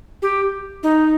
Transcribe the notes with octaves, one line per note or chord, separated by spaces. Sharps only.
G4
D#4